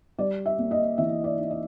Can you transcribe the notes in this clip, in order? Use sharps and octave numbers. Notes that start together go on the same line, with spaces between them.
G3 D5
E5
A#3
D#5
E3 E5
D5
D#4
D#5